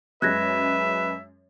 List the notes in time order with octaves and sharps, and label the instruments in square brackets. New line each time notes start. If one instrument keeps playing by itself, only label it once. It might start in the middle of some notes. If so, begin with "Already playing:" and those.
[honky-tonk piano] F#2 G#3 C#4 [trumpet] B4 [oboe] E5 [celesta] F#6 G#6 A#6